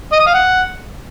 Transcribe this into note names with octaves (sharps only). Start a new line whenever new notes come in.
D#5
D#6
F5
F#5